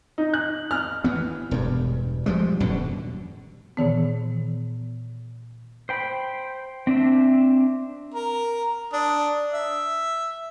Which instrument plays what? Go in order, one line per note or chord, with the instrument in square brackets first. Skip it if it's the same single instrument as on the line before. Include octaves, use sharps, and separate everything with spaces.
[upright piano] D#4
F#6
F6
[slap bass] E3 B3
E1 G2
F3 G3 G#3
D#1 F#2 B2 D3
[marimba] A#2 D#3 E3 B3
[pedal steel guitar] C5 G5 B5
C4 D4 E5
[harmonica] A#4
D4 D#6
E5